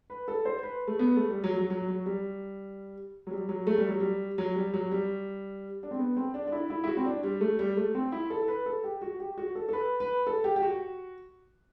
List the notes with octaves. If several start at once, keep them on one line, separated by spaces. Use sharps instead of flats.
B4
A4
C5
B4
A3
B3
A3
G3
F#3
F#3
F#3
F#3
G3
F#3
G3
F#3
A3
G3
F#3
G3
F#3
G3
F#3
G3
D4
C4
B3
C4
D4
D4
E4
E4
E4
F#4
C4
D4
G3
A3
G3
A3
C4
E4
A4
B4
A4
G4
F#4
G4
F#4
A4
A4
B4
B4
A4
G4
G4
F#4